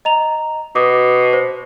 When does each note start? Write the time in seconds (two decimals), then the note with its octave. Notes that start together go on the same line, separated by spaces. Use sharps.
0.05 D#5 A#5 F7
0.75 B2 D6 D#6
1.33 C5